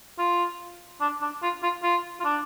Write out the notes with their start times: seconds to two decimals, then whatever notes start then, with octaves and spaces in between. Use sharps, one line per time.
0.19 F4
1.01 D4
1.22 D4
1.43 F4
1.63 F4
1.83 F4
2.20 F4
2.25 D4